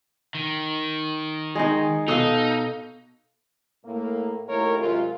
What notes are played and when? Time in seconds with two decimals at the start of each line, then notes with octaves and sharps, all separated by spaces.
0.35 D#3
1.55 G#3 D#4 G#4
2.08 B2 D#4 A4 F5 D#6
3.85 A2 A#3
4.48 D#2 A3 E4 A#4 C#5
4.79 F#2 C3 G#3 F4